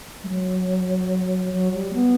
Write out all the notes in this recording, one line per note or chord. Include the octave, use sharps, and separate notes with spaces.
G3
F#3
F#3
G3
B3